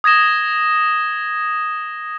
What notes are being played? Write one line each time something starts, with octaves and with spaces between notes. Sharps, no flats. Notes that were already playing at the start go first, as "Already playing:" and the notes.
D#6 G#6 A#6 E7 G7